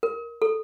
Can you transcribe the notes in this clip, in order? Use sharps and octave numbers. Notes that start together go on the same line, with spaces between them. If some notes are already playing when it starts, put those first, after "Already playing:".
A#4
A4